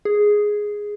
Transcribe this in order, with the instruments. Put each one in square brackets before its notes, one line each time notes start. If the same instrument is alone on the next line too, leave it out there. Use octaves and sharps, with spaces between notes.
[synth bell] G#4